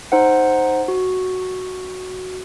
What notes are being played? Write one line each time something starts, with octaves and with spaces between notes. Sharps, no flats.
D#4 C5 F#5
F#4